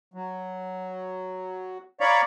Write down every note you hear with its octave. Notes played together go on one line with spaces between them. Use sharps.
F#3
C#5 D5 F5 A#5 B5 C#6